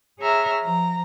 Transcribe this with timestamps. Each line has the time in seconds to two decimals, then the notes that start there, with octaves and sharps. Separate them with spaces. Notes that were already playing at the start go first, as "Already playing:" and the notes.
0.19 G#4 C#5 E5 A#5 F6
0.62 F3 A#5